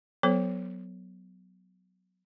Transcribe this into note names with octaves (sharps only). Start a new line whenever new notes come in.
F#3 B3 A4 C5